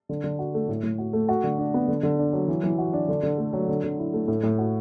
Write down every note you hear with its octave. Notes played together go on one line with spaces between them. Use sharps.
D3
D3
F#4
A3
A2
A2
F#4
A3
F#4
D3
D4
B3
D3
D3
D4
F#3
E3
E3
F#4
D4
D3
D3
A3
F#3
D3
D3
E4
A3
A2
A2
F#4